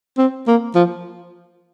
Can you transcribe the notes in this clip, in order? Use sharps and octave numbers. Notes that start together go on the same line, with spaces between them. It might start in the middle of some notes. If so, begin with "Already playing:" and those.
C4
A#3
F3